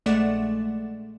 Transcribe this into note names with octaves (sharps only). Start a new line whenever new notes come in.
A#1 G#3 A3 D5 F#5 E7